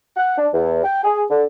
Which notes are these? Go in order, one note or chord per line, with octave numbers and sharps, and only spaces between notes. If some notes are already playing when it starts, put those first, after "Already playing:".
F#5
D4
E2
G5
G#4
D3